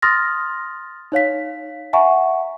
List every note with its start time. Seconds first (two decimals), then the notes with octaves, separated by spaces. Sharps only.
0.02 C6 D#6 F6 A6 A#6
1.12 D#4 C#5 F5 B6
1.93 E5 F#5 G#5 A#5 C#6